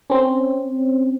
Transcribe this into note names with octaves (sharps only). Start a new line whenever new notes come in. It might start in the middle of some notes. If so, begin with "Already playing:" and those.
C4 C#4